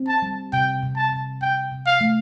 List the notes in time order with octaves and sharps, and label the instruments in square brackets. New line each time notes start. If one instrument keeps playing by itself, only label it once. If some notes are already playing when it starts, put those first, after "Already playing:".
Already playing: [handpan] C4
[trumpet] A5
[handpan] G3
[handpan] C3 [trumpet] G5
[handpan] C3
[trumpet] A5
[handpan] C3
[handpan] C3 [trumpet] G5
[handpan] C3
[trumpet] F5
[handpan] A3